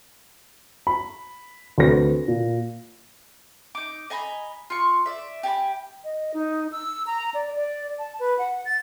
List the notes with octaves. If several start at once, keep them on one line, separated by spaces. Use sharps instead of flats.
B5
D2 C4 B4 A#6
A#2
D#4 D6
D#5 G#5 A#5 B5
F4 C#6
D5 E5
G4 G#5 A5 B5
D#5
D#4
E6
A#5
D5
D5
A5
B4
F#5
A6